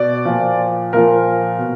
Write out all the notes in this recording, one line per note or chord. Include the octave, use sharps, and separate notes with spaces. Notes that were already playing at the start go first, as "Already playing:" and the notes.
Already playing: B2 D5
A#2 F3
A#2 F3 A#4
B2